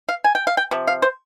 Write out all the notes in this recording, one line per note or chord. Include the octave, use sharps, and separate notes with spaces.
F5
G#5
G5
F5
G5
C3 F3
F5
C5